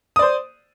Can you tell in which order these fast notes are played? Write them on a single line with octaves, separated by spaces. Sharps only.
D#6 D5 C5